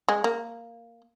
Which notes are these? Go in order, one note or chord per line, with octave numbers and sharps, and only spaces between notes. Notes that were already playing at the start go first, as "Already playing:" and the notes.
G#3
A#3